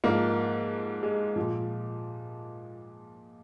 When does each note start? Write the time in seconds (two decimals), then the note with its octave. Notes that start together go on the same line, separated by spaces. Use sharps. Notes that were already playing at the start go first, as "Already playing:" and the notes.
0.04 G#2 F3 A#3
1.03 G#3
1.36 A#2 F3